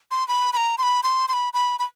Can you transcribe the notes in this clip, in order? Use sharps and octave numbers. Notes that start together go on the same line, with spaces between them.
C6
B5
B5
A#5
C6
B5
C6
C6
B5
B5
B5